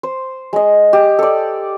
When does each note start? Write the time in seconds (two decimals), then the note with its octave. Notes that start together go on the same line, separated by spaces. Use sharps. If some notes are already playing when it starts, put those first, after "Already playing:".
0.03 C5
0.53 G#3 D#5
0.93 G4
1.19 A4 D5